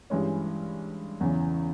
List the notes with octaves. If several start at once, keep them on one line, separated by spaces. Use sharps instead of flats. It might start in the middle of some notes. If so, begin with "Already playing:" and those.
G2 E3 G#3 C#4
E2 C#3 E3